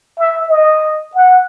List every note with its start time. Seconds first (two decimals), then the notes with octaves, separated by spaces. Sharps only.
0.19 E5
0.49 D#5
1.15 F#5